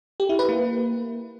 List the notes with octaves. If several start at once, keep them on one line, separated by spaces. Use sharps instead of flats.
G4
E4
B4
A#3